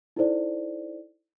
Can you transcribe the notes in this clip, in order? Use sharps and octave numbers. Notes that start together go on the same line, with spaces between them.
D#4 E4 A4 C5 D5